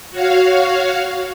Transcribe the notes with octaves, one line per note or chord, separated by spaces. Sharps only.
F#4 C#5 F5